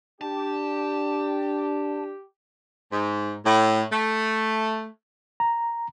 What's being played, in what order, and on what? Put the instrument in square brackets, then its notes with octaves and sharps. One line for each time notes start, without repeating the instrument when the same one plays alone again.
[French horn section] D4 [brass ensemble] G4 [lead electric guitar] A5
[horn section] G#2
A2
A3
[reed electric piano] A#5